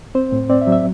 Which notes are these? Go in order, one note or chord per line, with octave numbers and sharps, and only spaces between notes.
C4 C5
A2
C4 D5
E5
F#3
E5